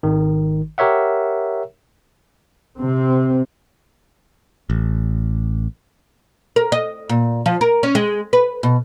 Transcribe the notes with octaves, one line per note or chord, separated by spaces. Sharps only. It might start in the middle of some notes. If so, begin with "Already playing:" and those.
G#1 D#3
G4 A#4 C#5 E5 F#5
C3 C4
A1
A#4
D#5
A#2
F3
A#4
C#4
G#3
B4
B2